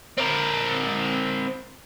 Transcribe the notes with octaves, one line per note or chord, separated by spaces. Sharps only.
C4 A#4